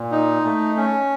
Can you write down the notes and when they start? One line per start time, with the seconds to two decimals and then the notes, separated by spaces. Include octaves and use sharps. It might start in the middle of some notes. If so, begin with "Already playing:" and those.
Already playing: A#2
0.11 D#4
0.45 A3
0.77 C#4